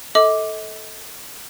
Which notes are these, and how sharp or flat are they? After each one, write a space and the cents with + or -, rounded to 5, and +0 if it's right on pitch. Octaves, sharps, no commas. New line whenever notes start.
A4 +0 D#5 +40 D6 +0